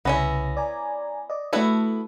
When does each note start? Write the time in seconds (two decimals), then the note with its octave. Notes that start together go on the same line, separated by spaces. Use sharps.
0.05 C2 C#3 B3 C#4 E4 A#6
0.57 D5 G#5 A#5
1.30 D5 D#5
1.53 A3 B3 E4 F#4 A4